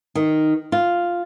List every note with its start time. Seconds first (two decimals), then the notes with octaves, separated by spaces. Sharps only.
0.15 D#3
0.72 F4